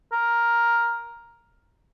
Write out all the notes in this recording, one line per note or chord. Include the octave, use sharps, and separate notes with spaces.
A#4